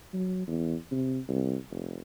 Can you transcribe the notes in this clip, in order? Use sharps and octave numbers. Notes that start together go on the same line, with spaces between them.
F#3
E2
C3
C2
F1